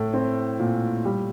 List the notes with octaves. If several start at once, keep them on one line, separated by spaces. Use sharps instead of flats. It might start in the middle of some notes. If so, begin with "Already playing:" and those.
Already playing: A2 A3
C4
A#2
G3